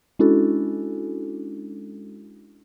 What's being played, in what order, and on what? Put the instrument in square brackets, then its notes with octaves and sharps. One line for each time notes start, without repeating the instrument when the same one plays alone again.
[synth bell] G#3 C#4 D4 E4 F#4 A4